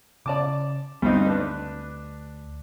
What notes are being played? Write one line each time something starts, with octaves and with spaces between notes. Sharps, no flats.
C#3 D5 A5 D6
D2 G2 C4 D#4
D4 B4